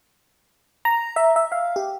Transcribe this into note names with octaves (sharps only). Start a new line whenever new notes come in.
A#5
E5
E5
F5
G4